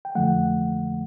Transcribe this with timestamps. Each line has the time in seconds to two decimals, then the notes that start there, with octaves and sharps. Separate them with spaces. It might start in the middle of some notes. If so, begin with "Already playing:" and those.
0.05 G5
0.15 F2 D3 F3 A3 F#5